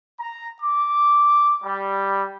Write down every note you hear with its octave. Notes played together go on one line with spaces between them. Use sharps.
A#5
D6
G3